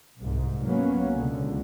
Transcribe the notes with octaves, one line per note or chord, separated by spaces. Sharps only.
C2 G#2
F#3 A#3 B3 C#4
C#2 B2 D3